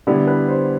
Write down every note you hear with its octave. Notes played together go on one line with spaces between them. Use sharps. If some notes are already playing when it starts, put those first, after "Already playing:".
D3 G3 B3 E4
B4
C5